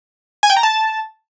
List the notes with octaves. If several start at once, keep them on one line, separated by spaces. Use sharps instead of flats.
G#5
G5
A#5
A5